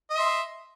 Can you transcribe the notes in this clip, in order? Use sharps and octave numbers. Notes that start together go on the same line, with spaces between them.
D#5 E5 C6